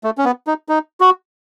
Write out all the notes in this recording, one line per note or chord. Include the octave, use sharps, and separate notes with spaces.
A3
C#4
B3
D#4
D#4
F#4